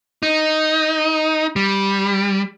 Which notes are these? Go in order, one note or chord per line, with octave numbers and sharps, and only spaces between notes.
D#4
G3